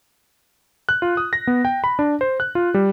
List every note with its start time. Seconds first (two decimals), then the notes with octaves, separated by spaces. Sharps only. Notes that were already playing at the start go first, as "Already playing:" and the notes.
0.89 F#6
1.02 F4
1.17 D#6
1.33 A#6
1.47 B3
1.65 G5
1.84 B5
1.99 D4
2.21 C5
2.40 F#6
2.55 F4
2.74 G3